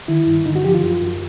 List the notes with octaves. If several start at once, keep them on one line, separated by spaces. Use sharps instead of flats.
D#3 E4
G2
D3 D#4
F#4
F3 G4
F4
F#2
F#2